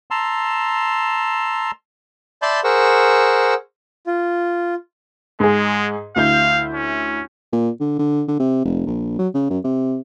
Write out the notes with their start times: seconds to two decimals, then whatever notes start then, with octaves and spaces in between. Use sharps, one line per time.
0.11 A5 A#5 C6 E6
2.42 D5 E5 A5 B5 C6 G6
2.64 G#4 A#4 C5 F#5 C#6 E6
4.07 F4
5.40 G#2 G#3 G#4
6.16 D2 E4 F5 G6
6.74 C#4
7.52 A#2
7.80 D3
7.99 D3
8.28 D3
8.39 C3
8.65 F1
8.87 A#1
9.19 F#3
9.34 C#3
9.50 F#2
9.64 C3